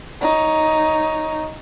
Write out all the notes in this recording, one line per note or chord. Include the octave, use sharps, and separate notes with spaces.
D#4 C#5